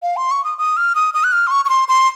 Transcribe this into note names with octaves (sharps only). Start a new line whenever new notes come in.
F5
C6
C#6
D#6
D#6
F6
D#6
D#6
F#6
F6
C6
C#6
C#6
C6
C6